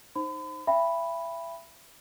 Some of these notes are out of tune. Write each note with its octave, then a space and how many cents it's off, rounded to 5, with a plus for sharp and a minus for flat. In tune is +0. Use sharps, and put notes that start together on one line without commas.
D#4 +0 C5 +10 B5 +40
E5 +30 G5 +20 B5 +0